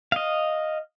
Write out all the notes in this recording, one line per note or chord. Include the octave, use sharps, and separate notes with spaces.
D#5 F5